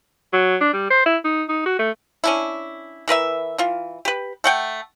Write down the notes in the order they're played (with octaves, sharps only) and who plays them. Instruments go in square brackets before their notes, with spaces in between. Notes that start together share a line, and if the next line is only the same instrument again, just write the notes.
[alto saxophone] F#3
D4
G3
C5
E4
D#4
D#4
F#4
A3
[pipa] C#4 D4 E4
E3 A#4 B4 E5
E3 F4
G4 B4
A3 F#5 G5